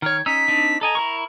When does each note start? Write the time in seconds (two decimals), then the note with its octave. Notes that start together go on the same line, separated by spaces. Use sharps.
0.02 D#3 C#5 F6
0.26 C#4 D#4 E6 B6
0.48 C4 D4 D#4
0.81 A4 D#5 G#5 A#5
0.95 E4 A#4 C#6